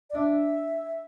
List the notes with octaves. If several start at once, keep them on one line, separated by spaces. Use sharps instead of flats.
D5
D4 E5